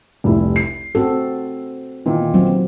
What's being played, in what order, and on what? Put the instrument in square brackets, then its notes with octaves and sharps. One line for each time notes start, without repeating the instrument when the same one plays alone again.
[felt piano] F1 C2 E4
C7
[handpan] C4 F#4 A4
[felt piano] A#2 D#3 E3
[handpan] F#3 C4